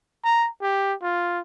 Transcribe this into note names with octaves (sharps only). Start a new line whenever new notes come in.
A#5
G4
F4